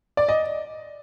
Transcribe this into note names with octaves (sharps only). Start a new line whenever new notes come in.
D5
D#5